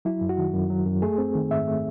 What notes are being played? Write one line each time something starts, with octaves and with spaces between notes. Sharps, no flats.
F#3 E4
F#2
F#4
D#3
F#2
F#3
F#2
A3 G#4
C4
D#3
G#2 E5
A3